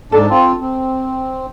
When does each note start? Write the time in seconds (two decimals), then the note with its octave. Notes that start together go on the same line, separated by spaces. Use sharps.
0.12 G#2 D4 A4
0.30 C4 F4
0.60 C4